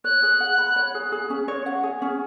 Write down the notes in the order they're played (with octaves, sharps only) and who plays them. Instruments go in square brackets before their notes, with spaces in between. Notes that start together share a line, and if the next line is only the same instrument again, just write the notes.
[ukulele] C#5 [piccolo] F#6
[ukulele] G#4
F#5
B5
C#5
G#4
G#4
C#4
C#5
F#5
G#4
C#4